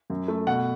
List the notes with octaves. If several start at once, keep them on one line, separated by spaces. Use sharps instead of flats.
F#2
A3
B2 F#5